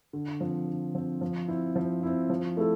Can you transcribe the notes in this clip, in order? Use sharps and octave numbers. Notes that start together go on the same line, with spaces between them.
D3
F3 C4
D3
F3 C4
F3
C4 E4
F3
C4 E4
F3
A3 E4 A4